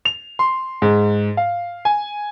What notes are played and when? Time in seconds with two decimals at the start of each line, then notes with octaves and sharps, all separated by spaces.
0.05 F7
0.39 C6
0.82 G#2
1.37 F5
1.85 G#5